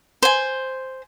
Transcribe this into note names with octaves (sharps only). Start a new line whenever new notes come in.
C5 G#5